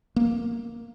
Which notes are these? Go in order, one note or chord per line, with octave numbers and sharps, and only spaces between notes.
A#3